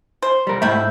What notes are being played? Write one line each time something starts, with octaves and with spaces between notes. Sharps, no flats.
C5
G3 A#4
G#2 C3 A3 E4 E5 G6